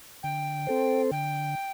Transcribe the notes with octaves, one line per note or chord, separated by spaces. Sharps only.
D3 G5
C4 A4 C5
D3 G5